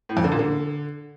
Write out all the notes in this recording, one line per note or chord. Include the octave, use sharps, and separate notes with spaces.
A2
F2
D3
A#2
D3